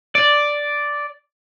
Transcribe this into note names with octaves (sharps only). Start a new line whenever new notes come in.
D5